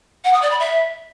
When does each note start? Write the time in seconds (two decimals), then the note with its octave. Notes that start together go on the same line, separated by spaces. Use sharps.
0.24 F#5
0.33 D#6
0.42 D5
0.51 B5
0.60 E5